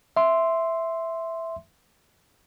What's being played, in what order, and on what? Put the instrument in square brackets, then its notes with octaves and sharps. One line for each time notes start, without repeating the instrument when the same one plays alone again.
[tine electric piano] E5 C6